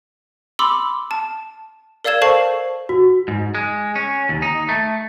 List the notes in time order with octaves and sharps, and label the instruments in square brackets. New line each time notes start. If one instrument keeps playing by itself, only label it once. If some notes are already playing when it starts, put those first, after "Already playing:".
[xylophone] B5 C6 D6 E6
A5
A#4 D5 F5 E6 G#6 E7
A4 C5 F5 A5 C#6 C7
[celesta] F#4
[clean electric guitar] G#2
G#3
C#4
D#2
D#4
A3